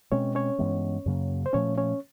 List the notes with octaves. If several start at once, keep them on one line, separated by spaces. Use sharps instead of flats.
B2 G#3 C4 C#4 C#5
C#4 C#5
G2 E3 G#3 B3
F#2 C#3 F#3 A#3
C5
A#2 F3 A3 C#4 C#5
C#4 C#5